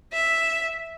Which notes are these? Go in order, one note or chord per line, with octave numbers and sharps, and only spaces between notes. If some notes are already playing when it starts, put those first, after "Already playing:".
E5